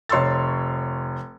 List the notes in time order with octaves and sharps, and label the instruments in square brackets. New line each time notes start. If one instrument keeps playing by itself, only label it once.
[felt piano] F1 C#5 C6 C#6 E6 A6